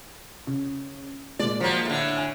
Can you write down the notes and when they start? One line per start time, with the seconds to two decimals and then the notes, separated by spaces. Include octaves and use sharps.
0.47 C#3
1.39 A#2 G#3 D5
1.60 F3 F#3
1.85 A2 D3
2.17 G#5